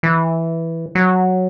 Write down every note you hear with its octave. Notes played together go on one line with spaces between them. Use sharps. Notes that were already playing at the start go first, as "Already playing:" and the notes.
E3
F#3